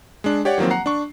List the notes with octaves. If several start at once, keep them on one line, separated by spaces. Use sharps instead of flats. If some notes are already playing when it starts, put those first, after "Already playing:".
G#3 D4
G4 C#5 D5 F#5
D#3 F3 F#3 A#3 C4
F#5 A#5 C7
D4 C#6